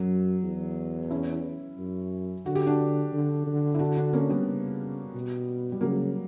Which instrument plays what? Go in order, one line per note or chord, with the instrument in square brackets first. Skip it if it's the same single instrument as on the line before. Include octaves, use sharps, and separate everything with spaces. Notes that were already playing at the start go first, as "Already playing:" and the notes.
Already playing: [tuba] F#2 [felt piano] F#3
[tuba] E2
[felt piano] C#4 E4
[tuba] F#2
[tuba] D3 [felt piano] F#4
[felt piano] G4
D4 F#4
[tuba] D3
D3
[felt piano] E4
D4 F#4
D4 F#4
A#3 C#4
G3 B3
[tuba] C#3
B2
[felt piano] G3
[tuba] C#3 [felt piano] F#3 A#3